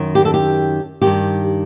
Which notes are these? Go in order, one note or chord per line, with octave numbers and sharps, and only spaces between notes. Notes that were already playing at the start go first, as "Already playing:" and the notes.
Already playing: F#2 D#3
G4
A4
G4
G2 D#3 G4